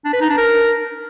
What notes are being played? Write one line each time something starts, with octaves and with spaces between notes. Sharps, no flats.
D4
B4
D#4
D4
A#4